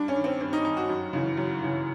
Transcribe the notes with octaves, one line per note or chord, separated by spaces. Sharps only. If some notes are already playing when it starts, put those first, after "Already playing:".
Already playing: G2 D4
C#4
D#3
C4
G2 C4
D#4
D#3 D#4
F#4
F#2
C#3 E3
F#2
C#3 E3